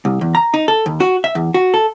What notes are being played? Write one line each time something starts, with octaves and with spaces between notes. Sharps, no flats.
C2
E2
A#5
D#4
A4
D#2
F#4
E5
E2
F#4
A4